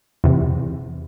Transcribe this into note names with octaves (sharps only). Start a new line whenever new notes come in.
E2 C3